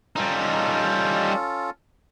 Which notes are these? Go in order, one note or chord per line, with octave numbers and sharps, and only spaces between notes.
G3 C#4 D#4 F4 A4